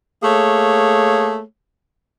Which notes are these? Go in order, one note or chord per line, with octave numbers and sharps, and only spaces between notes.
A3 A#3 G#4 C#5